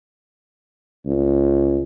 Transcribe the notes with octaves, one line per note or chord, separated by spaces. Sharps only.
C#2